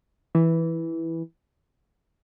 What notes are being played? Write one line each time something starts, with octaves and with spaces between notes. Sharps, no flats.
E3